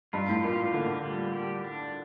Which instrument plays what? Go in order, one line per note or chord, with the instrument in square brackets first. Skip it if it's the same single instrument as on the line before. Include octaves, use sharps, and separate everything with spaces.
[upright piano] G2 [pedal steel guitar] F4
[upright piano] A2
[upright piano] A#2 [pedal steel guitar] F4
[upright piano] D3 [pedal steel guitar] A#3
[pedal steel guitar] G3
G4
D4